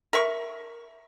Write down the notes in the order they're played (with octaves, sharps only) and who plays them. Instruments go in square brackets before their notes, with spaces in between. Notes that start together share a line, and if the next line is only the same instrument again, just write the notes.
[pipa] A#4 E5 C#6